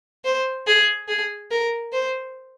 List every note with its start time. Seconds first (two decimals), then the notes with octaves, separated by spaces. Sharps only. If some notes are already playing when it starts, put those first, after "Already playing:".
0.25 C5
0.67 G#4
1.08 G#4
1.51 A#4
1.92 C5